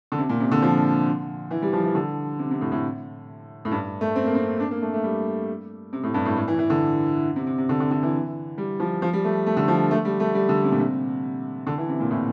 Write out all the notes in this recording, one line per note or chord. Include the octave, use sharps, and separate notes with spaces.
D3
C3
A#2
C3
D3
F3
E3
G3
F3
E3
D3
C3
C3
A2
A2
A2
G2
A3
C4
A#3
C4
D4
A#3
A3
A3
G3
C3
A2
G2
A2
A2
E3
E3
D3
C3
C3
C3
D3
D3
D3
E3
G3
F3
F3
G3
A3
A3
D3
F3
A3
G3
A3
G3
D3
C3
A#2
C3
D3
E3
C3
A#2
A2